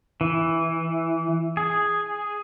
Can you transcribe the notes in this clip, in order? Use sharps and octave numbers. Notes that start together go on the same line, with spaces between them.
E3
G#4